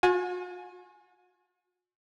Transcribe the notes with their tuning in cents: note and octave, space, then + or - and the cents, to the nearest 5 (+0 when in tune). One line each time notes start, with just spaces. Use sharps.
F#4 -45 G#5 +10